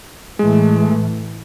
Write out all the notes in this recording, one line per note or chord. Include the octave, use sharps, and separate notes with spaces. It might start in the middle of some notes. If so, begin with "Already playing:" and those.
A2 E3 G#3 A3